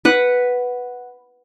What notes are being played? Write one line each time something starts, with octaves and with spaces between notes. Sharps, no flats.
B4 F#5